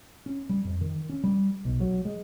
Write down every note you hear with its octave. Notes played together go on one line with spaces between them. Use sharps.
C#4
G3
F2
D#3
C#4
G3
B1
F#3
G#3